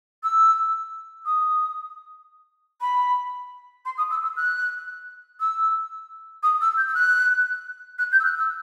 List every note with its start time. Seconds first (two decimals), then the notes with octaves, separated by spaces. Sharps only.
0.23 E6
1.25 D#6
2.80 B5
3.85 C6
3.97 D#6
4.10 E6
4.22 E6
4.36 F#6
5.39 E6
6.42 D#6
6.60 E6
6.77 G6
6.87 E6
6.94 F#6
7.98 F#6
8.11 G6
8.19 E6
8.24 F#6
8.37 E6